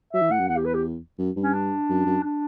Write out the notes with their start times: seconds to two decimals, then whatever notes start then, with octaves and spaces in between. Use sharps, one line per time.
0.13 F#3 E5
0.22 E3
0.31 A2 F#5
0.39 F#2
0.48 E2 F#5
0.57 G4
0.65 B4
0.74 G4
1.18 F#2
1.36 G2
1.43 C#4
1.53 D4
1.89 F#2
2.06 F#2
2.24 D4